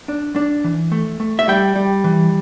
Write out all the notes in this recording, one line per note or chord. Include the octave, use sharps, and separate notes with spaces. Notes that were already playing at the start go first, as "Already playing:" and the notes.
D4
D4
E3
A3
A3
E5
G3 G5
G3
E3